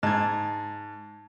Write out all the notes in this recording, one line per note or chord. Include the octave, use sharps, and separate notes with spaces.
G#2 A5 G#6